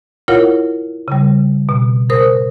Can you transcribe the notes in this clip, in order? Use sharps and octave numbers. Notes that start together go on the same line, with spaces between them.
E4 F4 A#4 C#5 F5 F#5
C#3 G3
B2
G#2 A#4 C5 D#6